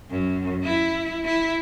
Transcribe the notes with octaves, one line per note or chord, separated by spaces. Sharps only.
F#2
E4
E4